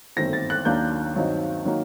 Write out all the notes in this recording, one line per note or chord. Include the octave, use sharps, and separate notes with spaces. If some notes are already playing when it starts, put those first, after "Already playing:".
G1 F#2 D#3 A3 C4 A#6
A6
F#6
D#2 D#3 F#3 A#3 D4 G6
G2 D#3 F#3 C4 D#4
D#3 F#3 A#3 D#4